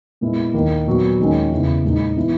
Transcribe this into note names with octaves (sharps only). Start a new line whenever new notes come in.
A#2 G#3 B3 E4
D#2 D#3 A#3
A#2 F#3 B3
D#2 D#3 G#3 C#4
E2 C#3 E3
A#2 G#3 D#4
E3 B3 E4